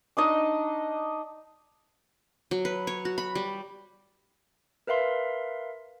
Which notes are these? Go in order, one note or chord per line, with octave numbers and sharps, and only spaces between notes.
D4 D#4 D#5
F#3
B4
C#5
F#4
B5
G3
A#4 B4 E5 F5 C6